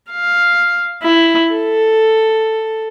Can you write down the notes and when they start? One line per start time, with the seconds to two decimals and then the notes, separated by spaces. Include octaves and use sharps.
0.12 F5
1.03 E4
1.53 A4